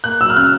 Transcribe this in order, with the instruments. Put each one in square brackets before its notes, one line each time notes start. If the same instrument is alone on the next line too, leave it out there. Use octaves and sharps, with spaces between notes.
[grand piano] A#3 [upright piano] F#6
[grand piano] F#3 [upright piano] E6
[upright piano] F6
[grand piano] C#3 [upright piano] F#6